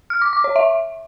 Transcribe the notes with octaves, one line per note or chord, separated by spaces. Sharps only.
F6
D6
D6
C#5
E5